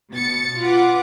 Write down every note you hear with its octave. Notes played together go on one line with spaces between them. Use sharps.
B2 A6 C#7
F4 B4 F#5 D6